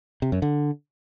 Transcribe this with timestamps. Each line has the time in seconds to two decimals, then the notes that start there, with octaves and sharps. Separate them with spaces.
0.22 C3
0.32 F#2
0.42 D3